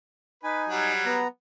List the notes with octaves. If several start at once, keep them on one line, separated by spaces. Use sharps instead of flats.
D#4 B4 G#5
F#3 G3
B3 A#5